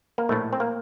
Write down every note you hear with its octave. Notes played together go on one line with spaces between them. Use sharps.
A#3
A#1 A2 A3
C4
A#3